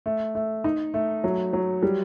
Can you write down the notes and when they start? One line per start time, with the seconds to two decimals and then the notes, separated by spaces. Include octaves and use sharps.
0.06 A3
0.35 A3
0.64 D#4
0.94 A3
1.24 F#3
1.53 F#3
1.83 G3